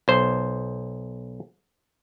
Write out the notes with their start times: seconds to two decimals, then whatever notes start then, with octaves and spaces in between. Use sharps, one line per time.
0.08 B1 C5